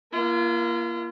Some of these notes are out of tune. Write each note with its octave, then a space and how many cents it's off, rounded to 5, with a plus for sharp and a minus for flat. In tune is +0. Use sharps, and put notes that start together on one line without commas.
A#3 +20 F4 -40